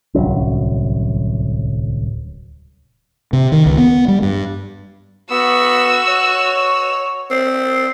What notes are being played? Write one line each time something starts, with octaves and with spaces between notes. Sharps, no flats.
D1 C2 F#3 C#4
C3
D#3
C#2
B3
G3
G2
B3 F#4 E6
C#5
C4